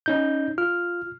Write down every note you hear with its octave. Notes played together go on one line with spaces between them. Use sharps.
C#4 D#4 G6
F4 F6